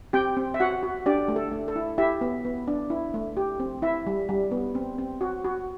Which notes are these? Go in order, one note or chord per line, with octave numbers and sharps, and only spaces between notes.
C4 G4 G5
C4
E5
F#4 F#5
F#4
D4 G4 D5
A3
A4
A3
A4
E4
E4 G4 E5
B3
B3
D4
E4
A3
G4
C4
E4 E5
G3
G3
B3
C4
C4
F#4
F#4